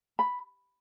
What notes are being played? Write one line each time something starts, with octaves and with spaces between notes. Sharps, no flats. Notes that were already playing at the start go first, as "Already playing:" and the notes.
B5